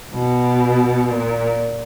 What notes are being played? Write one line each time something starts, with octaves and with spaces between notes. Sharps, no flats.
B2
A#2